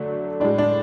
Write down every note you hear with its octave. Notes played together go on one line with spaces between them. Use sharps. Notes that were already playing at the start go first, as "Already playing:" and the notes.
Already playing: D3 F#3 A3 D4
A2 G#3 D4
D4